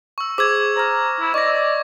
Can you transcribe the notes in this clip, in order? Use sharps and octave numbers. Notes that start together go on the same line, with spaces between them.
C#6 E6
G#4 C5 D6 E6 G#6
C5 A#5 F6
E4
D5 D#5 C#6 A#6